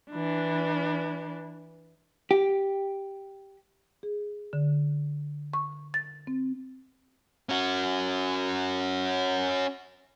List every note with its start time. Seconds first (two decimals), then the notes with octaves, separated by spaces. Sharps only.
0.11 E3 D4
2.31 G4
4.03 G#4
4.53 D3
5.54 C#6
5.94 A6
6.27 C4
7.49 C#4 F#4